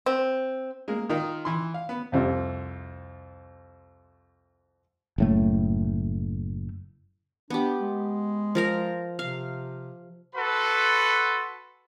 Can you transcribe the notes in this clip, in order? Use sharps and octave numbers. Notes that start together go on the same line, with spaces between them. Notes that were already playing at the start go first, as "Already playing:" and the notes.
C4
G#3 A#3
D#3 D#4 F4 A#4
E3 E4 C6
F5
B3
C2 F2 C3
F#1 A2 A3
B3 D4 G4
G#3
F3 A#4 A#5
C3 F5
F#4 A4 B4 F#5 B5 C6